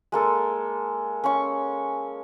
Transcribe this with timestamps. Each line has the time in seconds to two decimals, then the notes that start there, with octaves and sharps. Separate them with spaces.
0.12 G#3 A#3 A4
1.24 C#4 C#6